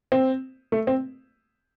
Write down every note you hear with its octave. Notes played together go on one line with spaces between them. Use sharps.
C4
A3
C4